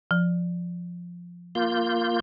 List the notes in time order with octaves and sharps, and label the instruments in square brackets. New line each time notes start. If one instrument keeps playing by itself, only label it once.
[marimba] F3
[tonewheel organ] A#3 F4 G6